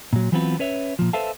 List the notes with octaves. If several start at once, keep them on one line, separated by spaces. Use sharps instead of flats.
A#2 F#3
E3 F#3 B3 C4 F4 B4
C#4 B4 C#5 E5
A#2 F3
A4 B4 C5 E5 F5 A5